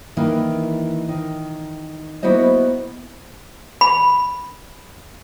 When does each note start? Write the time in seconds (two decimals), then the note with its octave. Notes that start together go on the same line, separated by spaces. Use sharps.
0.17 D#3 E3 A#3 E4
1.09 D#3
2.23 A#3 B3 E4 F#4 C5 D#5
3.81 B5